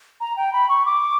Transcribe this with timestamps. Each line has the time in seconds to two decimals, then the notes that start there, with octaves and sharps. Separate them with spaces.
0.20 A#5
0.36 G5
0.53 B5
0.69 C#6
0.86 D6